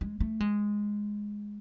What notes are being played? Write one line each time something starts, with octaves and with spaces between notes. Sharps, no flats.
G#3
A3
G#3